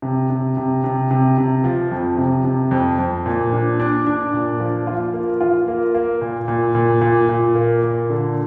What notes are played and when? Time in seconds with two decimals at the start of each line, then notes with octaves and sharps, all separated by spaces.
0.02 C3
0.30 C3
0.57 C3
0.84 C3
1.11 C3
1.38 C3
1.64 F3
1.92 F2
2.18 C3
2.45 C3
2.71 F2
2.99 F2
3.26 A#2
3.52 D4
3.80 D4
4.07 D4
4.33 A#2
4.60 F3
4.87 F4
5.13 A#3
5.41 F4
5.68 A#3
5.95 A#3
6.21 A#2
6.48 A#2
6.75 A#2
7.01 A#2
7.29 A#2
7.55 A#3
7.83 A#2
8.10 D3